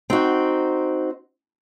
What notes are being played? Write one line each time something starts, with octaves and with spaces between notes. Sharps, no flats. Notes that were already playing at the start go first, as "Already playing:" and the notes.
C4 D#4 F#4